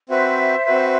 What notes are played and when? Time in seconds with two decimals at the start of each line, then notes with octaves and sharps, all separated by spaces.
0.09 C4 F#4 B4 C5 E5
0.66 C4 F#4 B4